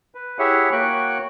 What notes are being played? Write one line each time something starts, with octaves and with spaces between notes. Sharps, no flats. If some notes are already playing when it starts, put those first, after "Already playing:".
B4
E4 G4 G#4 C#5 E5 F#5
A#3 F#4 C#5 G5 C#6 F#6